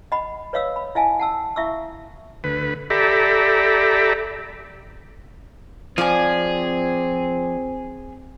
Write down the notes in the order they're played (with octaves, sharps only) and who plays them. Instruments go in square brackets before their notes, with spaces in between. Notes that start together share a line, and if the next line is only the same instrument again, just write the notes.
[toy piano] D#5 F#5 B5
B4 C#5 D#5 F5 D#6 E6
B5
E4 D#5 F5 G#5 A5
F#5 A5 E6
E4 E5 F5 C#6 D#6 E6
[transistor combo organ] D2 B4
G4 A4 D5 E5 A#5 B5
[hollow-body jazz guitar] F3 [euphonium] C4 [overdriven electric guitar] G#4 [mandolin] D5 G#5